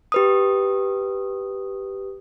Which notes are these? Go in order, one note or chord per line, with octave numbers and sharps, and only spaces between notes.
G4 B4 D#6